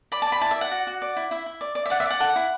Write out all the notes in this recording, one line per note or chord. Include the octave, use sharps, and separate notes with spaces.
D5 B5
D5 A5
B5
E4 A5
E5
D5
F#5
F#4
F#4
D5
E4
E4 E5
E4
D5
D5
E5
D5 F#5
E5
D5 F#5
A4 F#5
E4